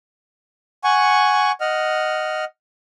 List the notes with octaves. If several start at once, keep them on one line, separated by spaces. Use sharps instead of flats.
F#5 G#5 C#6
D#5 F#5 F6